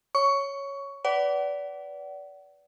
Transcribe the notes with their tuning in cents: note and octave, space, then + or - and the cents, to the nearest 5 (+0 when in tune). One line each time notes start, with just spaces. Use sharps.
C#5 +0 C#6 +15
B4 +0 D5 -25 F#5 +30